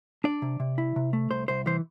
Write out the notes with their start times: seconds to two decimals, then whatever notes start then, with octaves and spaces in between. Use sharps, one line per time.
0.24 D4 D5
0.42 C3
0.60 C3
0.78 E4
0.96 C3
1.13 A3
1.31 C2 C5
1.48 C2 C5
1.66 E3 C5